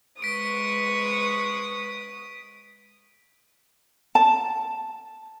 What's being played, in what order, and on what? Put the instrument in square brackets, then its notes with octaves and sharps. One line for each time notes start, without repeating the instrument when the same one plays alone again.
[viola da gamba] G#3 B4 [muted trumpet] C#6 [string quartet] D#6 [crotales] B6 D7
[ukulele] A5